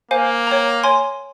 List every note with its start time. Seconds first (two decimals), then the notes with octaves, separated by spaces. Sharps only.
0.11 A#3 C5 F5 G#5
0.47 C#5 G5 A#5
0.84 C#5 G#5 C6